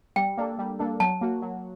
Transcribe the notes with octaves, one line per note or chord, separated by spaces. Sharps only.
G3 G5
A#3 D4 A4
G3
A#3 D4 A4
F#3 A5
A#3 F#4
F#3